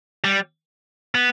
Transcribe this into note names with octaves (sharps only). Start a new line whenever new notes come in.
G3
B3